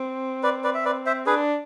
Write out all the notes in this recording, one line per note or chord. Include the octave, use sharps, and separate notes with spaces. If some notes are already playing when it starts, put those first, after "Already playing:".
Already playing: C4
B4 D5
B4 D5
E5
B4 D5
C5 E5
D4 G#4 B4